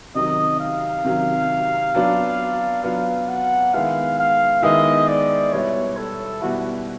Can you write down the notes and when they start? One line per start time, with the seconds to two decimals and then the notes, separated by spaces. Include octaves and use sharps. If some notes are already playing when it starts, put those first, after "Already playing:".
0.15 C3 D#3 F#3 D#5
0.60 F5
1.05 C3 D#3 F#3
1.95 F#3 B3 D4 F4
2.84 F#3 B3 D4 F4 F5
3.28 F#5
3.74 D#3 G#3 B3 E4 F5
4.19 F5
4.63 D#3 G#3 B3 E4 D#5
5.08 D5
5.52 B2 G3 B3 E4 C#5
5.97 A4
6.41 B2 G3 B3 E4 F#4